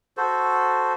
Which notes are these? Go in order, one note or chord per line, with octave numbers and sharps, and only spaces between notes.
F#4 A4 C5